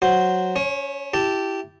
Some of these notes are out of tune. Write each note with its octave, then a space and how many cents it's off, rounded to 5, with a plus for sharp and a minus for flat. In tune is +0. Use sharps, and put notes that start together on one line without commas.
F#3 +0 F#4 +0 C5 +0
C#4 +25 C#5 -30
E4 +10 G4 -10 A5 +0